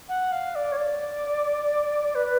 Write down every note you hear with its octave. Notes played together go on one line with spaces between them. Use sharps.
F#5
F5
D5
C#5
D5
B4